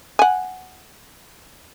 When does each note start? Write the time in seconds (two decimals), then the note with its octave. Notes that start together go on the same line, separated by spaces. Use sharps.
0.19 F#5 G#5